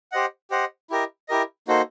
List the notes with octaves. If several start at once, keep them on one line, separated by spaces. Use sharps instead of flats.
G4 C5 D#5 F#5
G4 C5 D#5 F#5
E4 G4 A#4 D#5
E4 G4 A#4 D#5
A#3 D#4 F#4 A4 C5